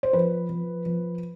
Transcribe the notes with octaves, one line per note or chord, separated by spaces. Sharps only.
C5
F3 B4
F3
F3